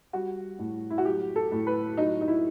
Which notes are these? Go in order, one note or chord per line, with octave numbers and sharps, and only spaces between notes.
G3 F#4
A2
E4
F#4
F#3 G4
A4
A2
B4
F#3 D#4
D#4
E4